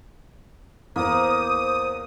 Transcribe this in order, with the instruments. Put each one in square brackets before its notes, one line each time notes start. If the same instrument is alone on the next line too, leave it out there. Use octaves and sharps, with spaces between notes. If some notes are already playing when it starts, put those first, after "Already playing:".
[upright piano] E2 [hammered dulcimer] A#3 [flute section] C5 [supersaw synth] D#6